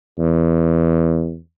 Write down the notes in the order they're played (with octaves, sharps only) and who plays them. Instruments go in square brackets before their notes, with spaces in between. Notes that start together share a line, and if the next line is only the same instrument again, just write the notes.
[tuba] E2